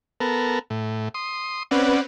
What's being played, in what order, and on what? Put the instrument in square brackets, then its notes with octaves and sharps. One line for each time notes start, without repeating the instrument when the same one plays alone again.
[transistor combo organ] B3 A4 A#4
A2
C6 D#6
[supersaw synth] C4 C#4 B4 [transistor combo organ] D5 F#5